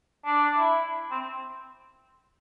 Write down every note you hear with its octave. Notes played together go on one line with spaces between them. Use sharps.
D4
E4
C4